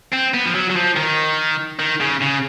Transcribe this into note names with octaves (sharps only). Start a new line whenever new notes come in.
C4
B3
F3
F#3
F#3
F3
D#3
D#3
C#3
C#3